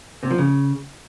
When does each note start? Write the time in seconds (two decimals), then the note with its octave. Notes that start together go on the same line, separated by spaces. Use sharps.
0.23 C3
0.30 F3
0.38 C#3